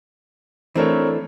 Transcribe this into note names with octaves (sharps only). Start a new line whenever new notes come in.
E3 A3 C4 D4 A#4 C#5